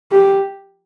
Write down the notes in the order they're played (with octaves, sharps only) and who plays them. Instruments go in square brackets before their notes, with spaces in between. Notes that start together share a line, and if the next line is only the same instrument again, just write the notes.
[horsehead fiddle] G4